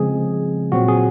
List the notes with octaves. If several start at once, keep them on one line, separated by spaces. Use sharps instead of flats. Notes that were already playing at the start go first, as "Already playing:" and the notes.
Already playing: C#3 F3 G#3 C4 G#4
A#2 F#3 C4 F#4
G#4